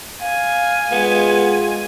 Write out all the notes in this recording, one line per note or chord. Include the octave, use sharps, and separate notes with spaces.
F5 G#5
G#3 B3 F4